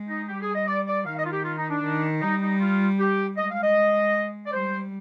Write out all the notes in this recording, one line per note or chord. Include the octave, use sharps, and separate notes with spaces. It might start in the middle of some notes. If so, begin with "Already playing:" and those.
Already playing: G#3
D#4
G3 G4
G#4
D#5
D5
D5
D#3 F5
D#5
F4
G4
F4
D#4
D4
D#3
G3 D#4
D#4
F4
G4
G#3 D#5
F5
D#5
D5
G3 C5